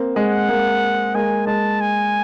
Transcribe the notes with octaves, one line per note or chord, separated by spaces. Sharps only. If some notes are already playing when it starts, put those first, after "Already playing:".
Already playing: A#3 C4
G#3 F#5
G#3 A#3
G#3 A#3 G#5
G#3 A5
G#5